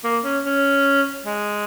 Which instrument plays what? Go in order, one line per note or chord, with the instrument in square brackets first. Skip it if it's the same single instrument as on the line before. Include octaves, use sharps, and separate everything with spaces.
[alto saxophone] A#3
C#4
C#4
G#3